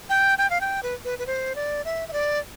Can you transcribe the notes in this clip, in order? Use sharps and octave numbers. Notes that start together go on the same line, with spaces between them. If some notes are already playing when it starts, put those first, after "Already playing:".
G5
G5
F5
G5
B4
B4
B4
C5
D5
E5
E5
D5